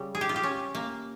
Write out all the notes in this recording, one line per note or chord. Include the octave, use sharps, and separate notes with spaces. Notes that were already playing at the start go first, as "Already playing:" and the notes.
Already playing: C#3 G3
G#4
G4
F4
G4
C#4
A#3